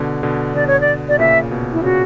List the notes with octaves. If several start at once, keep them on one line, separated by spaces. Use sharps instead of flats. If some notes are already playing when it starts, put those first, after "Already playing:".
Already playing: B2 D3
B2 D3
B2 D3 D5
C#5
D5
B2 D5
A#2 C#3 E5
B2
E4
A#2 C#3 F#4